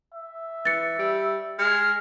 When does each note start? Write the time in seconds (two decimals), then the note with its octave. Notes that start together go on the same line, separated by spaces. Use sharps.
0.14 E5
0.65 E3 A6 C#7
0.98 G3
1.59 G#3 F6